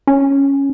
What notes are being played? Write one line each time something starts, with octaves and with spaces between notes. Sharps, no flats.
C#4